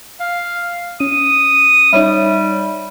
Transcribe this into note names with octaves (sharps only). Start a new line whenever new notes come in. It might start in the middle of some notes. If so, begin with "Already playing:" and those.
F5
C#4 D#6
G3 D#4 C#5 E5